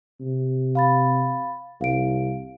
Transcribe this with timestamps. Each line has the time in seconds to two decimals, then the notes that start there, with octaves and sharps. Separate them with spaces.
0.21 C3
0.75 F5 B5 A6
1.81 C2 F5 D7